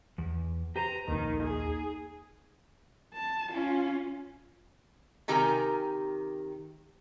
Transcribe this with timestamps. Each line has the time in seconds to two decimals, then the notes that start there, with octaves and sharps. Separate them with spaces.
0.18 E2
0.76 G4 B4 C5 A#5
1.08 A#1 D#2 D#3 A#3 D#4
1.43 G#4
3.14 A5
3.52 C#4 F4
5.28 C3 D#3 G4 A#4 G#5 A#5